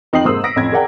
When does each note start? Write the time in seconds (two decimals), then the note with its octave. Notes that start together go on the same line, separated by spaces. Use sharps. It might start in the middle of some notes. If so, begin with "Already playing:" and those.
0.13 F2 D#4 G5 D#6 C7 F#7
0.25 G#2 C3 A#3 C5 D#6 E6
0.44 D#6 A#6 B6 D7
0.56 A1 F2 G#6
0.72 G#4 A#4 D5 F#5 G5 A#5